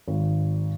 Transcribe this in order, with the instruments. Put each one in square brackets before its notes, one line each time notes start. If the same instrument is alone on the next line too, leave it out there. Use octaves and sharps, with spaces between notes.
[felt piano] G#1